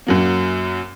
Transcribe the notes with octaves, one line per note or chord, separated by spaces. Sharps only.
F#2 F#3 A#3